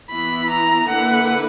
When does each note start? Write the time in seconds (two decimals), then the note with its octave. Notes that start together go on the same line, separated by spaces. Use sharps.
0.11 E3 B3 E4 B5
0.50 A#5
0.89 D3 A#3 E4 B4 F#5